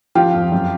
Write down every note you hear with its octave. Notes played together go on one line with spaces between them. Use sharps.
F3 F4 G4
F2
F#2